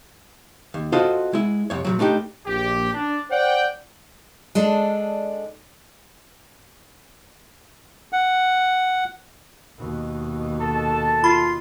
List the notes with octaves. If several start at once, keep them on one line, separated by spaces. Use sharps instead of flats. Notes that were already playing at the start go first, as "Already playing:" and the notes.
D#2
F4 F#4 A4 C5 D#5 F5
G#3 E4
C2 F2 C#5
A#2 C#3 F#3
A3 D4 D#4 G4
A#1 G4
D4
C5 D5 F#5 G5
G#3 D4 A4 D5
F#5
D#2 B2
A4 A5
F4 B5